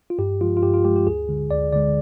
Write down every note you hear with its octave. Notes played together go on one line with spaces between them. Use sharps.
F4
G2 G4
F3 G#3 F4
F4
G2 G4
F4
F3 G#3 G4
G4
D2 G#4
D3 G#3
D2 D5
D3 G#3 D5